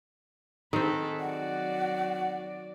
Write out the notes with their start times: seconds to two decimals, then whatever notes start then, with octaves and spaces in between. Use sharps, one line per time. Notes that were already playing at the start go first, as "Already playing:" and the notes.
0.73 D#3 C4 G#4 A4 B4
1.20 F#3 F#4 D5 F#5